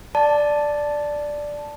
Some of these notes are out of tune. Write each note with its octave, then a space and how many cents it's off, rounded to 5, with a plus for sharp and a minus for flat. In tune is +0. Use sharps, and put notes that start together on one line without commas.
D5 +0 A5 +0